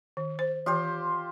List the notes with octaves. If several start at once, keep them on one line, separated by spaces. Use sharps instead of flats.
D#3
C5
E3 F4 G4 C5